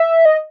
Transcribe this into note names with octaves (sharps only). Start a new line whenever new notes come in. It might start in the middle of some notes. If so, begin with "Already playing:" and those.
Already playing: E5
D#5